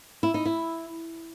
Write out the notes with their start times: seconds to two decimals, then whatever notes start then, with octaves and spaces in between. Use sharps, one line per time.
0.23 E4
0.34 D#4
0.46 E4